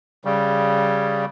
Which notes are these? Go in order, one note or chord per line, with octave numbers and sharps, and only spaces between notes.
C#3 G3